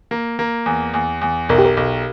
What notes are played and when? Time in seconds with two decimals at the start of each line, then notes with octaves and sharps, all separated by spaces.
0.11 A#3
0.39 A#3
0.66 E2
0.94 E2
1.21 E2
1.49 B1 A#4
1.58 G4
1.65 A#4
1.77 B1